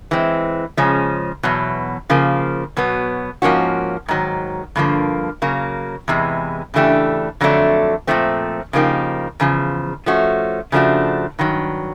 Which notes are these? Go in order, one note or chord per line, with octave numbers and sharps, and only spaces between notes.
E3 G#3 C4
C#3 F3 G#3 C#4
E2 B2 F#3
C#3 F3 A#3
B2 F#3 B3
G#2 F3 A#3 C#4 F#4
G#2 D#3 F#3
G2 D3 F3 A#3
C#3 F#3 A#3
E2 C3 E3 G#3
C#3 E3 A3 D4 G4
F2 D3 F#3 A3 D4
A#2 F3 A3 C4
C#3 F3 A#3 D#4 G4
E2 C#3 F3
F3 A3 C#4 F#4
C#3 F3 A3 D4 F#4
G2 D#3 F#3